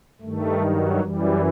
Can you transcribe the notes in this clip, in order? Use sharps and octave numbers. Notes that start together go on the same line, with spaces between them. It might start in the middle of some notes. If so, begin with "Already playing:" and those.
G2 D#3 A3
F#3
F#2 E3 G3